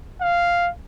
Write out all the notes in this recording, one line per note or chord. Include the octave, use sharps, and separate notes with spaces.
F5